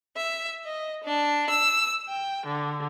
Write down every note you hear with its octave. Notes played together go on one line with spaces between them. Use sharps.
E5
D#5
D4
E6
G5
D3